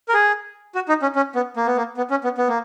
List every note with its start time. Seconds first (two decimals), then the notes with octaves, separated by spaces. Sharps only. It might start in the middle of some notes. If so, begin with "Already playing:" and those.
0.09 A#4
0.14 G#4
0.75 F#4
0.88 D#4
1.02 C#4
1.15 C#4
1.35 B3
1.56 A#3
1.67 B3
1.77 A#3
1.97 B3
2.10 C#4
2.24 B3
2.38 B3
2.48 A#3